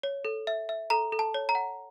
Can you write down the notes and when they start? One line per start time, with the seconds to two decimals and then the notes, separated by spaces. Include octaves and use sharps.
0.03 C#5
0.25 A4
0.47 E5
0.69 E5
0.90 A4 A#5
1.12 A4
1.19 A5
1.34 C#5
1.49 A#5
1.55 F#5